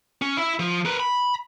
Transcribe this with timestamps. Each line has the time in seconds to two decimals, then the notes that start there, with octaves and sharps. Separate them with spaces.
0.22 C#4
0.37 E4 E5
0.59 F3
0.85 A#4 B4
1.00 B5